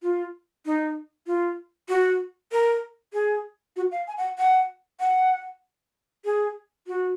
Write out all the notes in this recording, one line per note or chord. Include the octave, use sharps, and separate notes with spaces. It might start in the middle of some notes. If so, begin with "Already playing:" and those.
F4
D#4
F4
F#4
A#4
G#4
F#4
F5
G#5
F#5
F#5
F#5
G#4
F#4